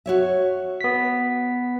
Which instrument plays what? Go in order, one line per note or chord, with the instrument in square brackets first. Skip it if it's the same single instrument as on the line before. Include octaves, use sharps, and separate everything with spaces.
[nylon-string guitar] F#4 C#5 E5
[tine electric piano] B3 B6